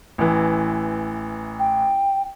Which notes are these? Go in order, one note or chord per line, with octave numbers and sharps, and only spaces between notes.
A1 E3
G5